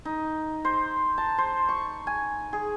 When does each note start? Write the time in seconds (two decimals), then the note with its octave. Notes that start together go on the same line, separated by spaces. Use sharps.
0.05 D#4
0.65 C5
1.18 A5
1.38 C5
1.69 C#6
2.07 G#5
2.53 G#4